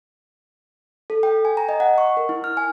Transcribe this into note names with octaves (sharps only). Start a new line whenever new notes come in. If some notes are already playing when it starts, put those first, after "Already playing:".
A4
G5
G#5
A#5
D#5
F#5
C#6
A#4
E4
F6
G#5